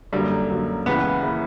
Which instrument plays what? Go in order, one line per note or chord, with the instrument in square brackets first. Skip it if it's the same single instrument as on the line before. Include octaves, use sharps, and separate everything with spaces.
[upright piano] F#2 D3 F#3 A#3 [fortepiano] G3
[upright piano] F#2 D3 F#3 A#3
[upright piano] C#2 C#3 E3 A#3 E4 [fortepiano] B3
[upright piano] C#3 E3 A#3 E4